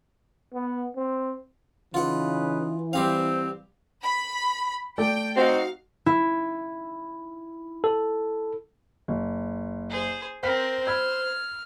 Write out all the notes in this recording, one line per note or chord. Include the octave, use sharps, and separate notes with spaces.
B3
C4
C#3 E3 D#4 F4 B4 F#5
G3 C4 G4 F5
B5
A3 D5 G5
C4 D#4 F#4 F5
E4
A4
F#1
G#4 C5
C4 A#4 C5 G5 F6 B6
B5 E6 F6 G#6